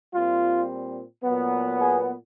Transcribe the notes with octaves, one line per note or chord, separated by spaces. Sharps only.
A#2 G3 C4 F4
A#2 F#3 B3
G#4